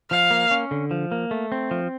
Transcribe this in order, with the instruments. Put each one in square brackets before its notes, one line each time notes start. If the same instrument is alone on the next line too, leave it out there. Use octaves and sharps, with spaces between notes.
[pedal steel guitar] F3 [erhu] F5
[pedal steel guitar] A#3
C#4
D3
F3
A#3
A3
C4
F3